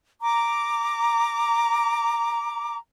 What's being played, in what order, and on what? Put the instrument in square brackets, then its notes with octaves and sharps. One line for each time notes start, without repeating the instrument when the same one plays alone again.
[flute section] A#5 D6